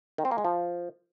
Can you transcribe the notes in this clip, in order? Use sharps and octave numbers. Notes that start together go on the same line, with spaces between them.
D#3
C4
A#3
G#3
F3